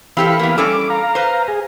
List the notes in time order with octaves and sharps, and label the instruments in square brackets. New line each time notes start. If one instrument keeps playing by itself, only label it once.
[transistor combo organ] E3 F5 B5 [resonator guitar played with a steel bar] C4 G4 A4
[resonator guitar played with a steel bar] A#3 B3
[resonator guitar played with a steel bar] G3 C#4 A4 [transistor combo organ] D6
[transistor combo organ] F5 A#5
[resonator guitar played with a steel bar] B4 C5
[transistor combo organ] G#4